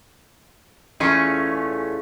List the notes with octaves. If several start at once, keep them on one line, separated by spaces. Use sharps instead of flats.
E2 A3 C#4 F4 G#4